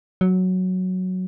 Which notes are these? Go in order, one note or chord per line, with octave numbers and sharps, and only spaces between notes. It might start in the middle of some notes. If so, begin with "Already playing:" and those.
F#3